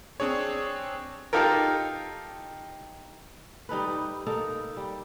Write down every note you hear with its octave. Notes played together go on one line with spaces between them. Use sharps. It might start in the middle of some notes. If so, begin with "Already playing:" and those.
C4 D4 G#4 C#5
D#4 F4 G4 A4 A#4
G3 D#4 A4 B4
G3
A#3 D#4 A4
G3